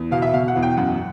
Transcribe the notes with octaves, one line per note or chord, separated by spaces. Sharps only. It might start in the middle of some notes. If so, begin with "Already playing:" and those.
Already playing: E2
B2 F5
E5
B2 F5
F#5
E2
G5
F#2 F#5